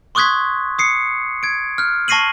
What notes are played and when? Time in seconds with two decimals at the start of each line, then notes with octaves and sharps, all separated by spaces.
0.15 C6 C#6 D#6 F#6 G#6 B6
0.79 D#6 C7 C#7
1.43 G#6 D7
1.78 F6 F#6
2.08 A5 C#6 A#6 C7 D#7 F#7